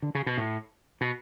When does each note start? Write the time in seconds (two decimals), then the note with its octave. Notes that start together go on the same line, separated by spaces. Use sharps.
0.02 D3
0.15 C#3
0.26 B2
0.38 A2
1.01 B2